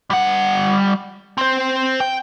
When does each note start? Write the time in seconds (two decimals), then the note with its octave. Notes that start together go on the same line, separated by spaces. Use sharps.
0.10 G3 F#5
1.38 C4 C5
2.00 G5